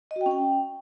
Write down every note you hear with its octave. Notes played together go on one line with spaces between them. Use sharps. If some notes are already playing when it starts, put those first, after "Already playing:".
D#5
F#4
G5
C#4
G5